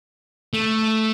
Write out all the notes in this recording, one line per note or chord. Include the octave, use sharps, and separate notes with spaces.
A3